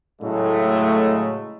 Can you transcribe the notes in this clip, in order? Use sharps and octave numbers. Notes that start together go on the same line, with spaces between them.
A2 C#3 F#3 G#3 A3